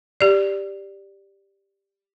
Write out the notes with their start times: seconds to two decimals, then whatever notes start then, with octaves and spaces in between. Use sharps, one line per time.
0.21 G4 D5